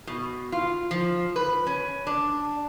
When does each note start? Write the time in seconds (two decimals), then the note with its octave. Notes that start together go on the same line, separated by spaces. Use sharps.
0.07 B2
0.52 F4
0.91 F3
1.36 B4
1.67 C#4
2.07 D4